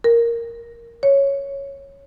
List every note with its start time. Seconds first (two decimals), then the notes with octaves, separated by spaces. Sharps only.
0.04 A#4
1.03 C#5